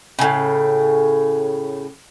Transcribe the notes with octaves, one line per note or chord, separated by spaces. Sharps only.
A2 C#3